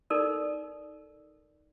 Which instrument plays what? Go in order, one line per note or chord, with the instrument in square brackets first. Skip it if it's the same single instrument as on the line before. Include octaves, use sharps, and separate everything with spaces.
[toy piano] D#4 A4 A#4 D5